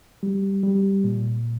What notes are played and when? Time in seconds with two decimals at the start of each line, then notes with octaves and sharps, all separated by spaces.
0.23 G3
0.63 G3
1.04 A#2